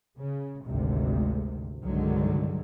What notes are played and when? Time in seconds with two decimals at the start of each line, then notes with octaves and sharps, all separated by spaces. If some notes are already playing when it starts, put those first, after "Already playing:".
0.20 C#3
0.65 G#1 D2 C3
1.81 C2 G2 D3 D#3 F#3 G#3